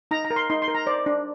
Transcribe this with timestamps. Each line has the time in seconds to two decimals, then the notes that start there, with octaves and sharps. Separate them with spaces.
0.11 D#4 A#5
0.25 A#5
0.31 A#4
0.36 C6
0.50 D#4 C6
0.62 C6
0.68 A#4
0.75 A#5
0.86 C5 D5
1.06 D4